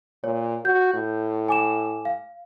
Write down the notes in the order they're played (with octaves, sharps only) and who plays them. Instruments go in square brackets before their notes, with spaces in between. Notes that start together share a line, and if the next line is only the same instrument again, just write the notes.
[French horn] A#2 [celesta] C#5
[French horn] F#4 [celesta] G6
[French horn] A2
[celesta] G#5 D6 E7
F5